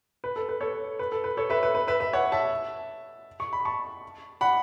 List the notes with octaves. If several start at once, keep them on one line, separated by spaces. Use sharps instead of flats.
B4
A4
B4
A4 C#5
B4
A4
B4
A4 C#5
B4 E5
B4
B4
B4 E5
B4 E5
C#5 F#5
E5 A5
C#6
B5
A5 C#6
F#5 B5